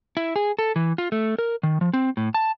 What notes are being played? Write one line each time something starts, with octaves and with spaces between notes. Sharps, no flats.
E4
G#4
A4
E3
F4
A3
A#4
D#3
F3
C4
A2
A5